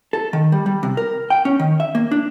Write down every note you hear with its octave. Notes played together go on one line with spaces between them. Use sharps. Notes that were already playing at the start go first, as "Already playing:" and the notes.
A4
D#3
G3
G3
C3
A#4
G5
C#4
D#3
E5
A#3
D4